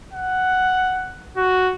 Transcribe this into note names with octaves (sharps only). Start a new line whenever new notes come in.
F#5
F#4